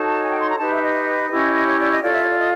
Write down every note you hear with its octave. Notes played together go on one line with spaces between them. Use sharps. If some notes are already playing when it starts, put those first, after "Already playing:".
Already playing: D#4 F#4 A4 C#5 A5
G#5
G5
C6
A#5
D#4 G4 B4 A5
E5
D#5
C#4 E4 G4
C#5
D5
D#5
F4 A4 C#5 D5
E5
C#5
D5
D#5